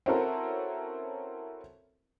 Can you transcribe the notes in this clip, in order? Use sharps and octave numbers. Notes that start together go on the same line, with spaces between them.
C4 C#4 E4 F#4 A4 A#4